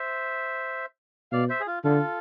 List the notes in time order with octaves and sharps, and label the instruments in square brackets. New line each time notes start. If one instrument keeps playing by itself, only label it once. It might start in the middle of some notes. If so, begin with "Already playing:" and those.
Already playing: [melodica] C5 E5
[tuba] B2 [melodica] D5 F5
[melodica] C5 E5
G#4
F4
[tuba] D3 [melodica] F4 A4